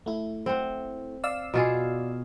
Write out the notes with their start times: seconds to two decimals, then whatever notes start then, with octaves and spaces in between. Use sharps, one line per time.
0.06 A3 E4
0.46 C4 F#5
1.24 D5 F5 E6
1.54 B2 F4 G#4